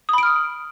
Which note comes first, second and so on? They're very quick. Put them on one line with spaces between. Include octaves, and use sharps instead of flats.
D#6 B5 D7 F6